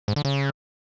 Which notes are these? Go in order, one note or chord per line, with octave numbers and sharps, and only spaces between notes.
G#2
D3
C#3